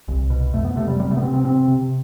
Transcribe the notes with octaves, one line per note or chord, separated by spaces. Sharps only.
C2
B2
F2 A3
B3
C3 A3
G3
C3 G3
A3
B3
C3 C4
C4
C3 C4
C3